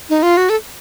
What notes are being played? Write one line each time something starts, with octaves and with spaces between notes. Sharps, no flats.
D#4
F4
F#4
A4